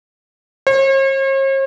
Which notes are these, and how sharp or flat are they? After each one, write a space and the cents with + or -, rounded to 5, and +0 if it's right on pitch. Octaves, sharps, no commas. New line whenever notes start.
C#5 -45